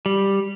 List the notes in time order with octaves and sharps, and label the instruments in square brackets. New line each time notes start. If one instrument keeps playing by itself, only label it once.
[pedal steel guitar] G3